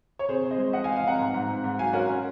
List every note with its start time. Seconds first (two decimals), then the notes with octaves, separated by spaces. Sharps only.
0.19 C#5
0.29 C3 G#4 C5
0.43 C3
0.51 C5 D#5
0.58 G#3
0.73 F3 D#5 F#5
0.84 F5 G#5
0.88 F3
0.96 F5 G#5
1.03 C3 F#5 A#5
1.19 G#2
1.34 G#2
1.48 G#2
1.64 G#2
1.79 F#3 F5 G#5
1.93 C#4 F#4 A#4
2.09 C#4